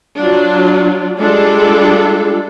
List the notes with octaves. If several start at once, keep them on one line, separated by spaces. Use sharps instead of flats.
F#3 D4 F4
G3 G#3 D4 F4 A4